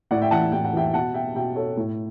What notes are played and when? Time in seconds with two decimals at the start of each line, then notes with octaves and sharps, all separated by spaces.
0.11 A2 D5 F#5
0.22 E5 G5
0.31 E3 F#5 A5
0.52 A2 G5
0.64 F#5
0.74 E3 E5 G5
0.94 B2 F#5 A5
1.14 E5 G5
1.35 B2 E5 G5
1.56 A4 C#5
1.77 A2